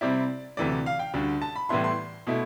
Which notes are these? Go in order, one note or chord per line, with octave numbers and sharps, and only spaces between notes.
C3 G3 C4 E4 D5
D2 C3 E3 A3 D5
F5
G5
D2 D3 G3
A5
B5
A2 E3 G3 B3 E4 C6
C6
B2 A3 E4